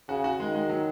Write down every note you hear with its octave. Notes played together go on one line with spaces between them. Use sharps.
C#3 F#4
F#4
D#3 G#3
G#3
F#3